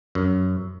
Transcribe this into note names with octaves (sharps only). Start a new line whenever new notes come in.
F#2